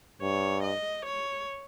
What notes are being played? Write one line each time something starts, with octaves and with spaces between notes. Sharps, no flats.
G2 C#5
D#5
C#5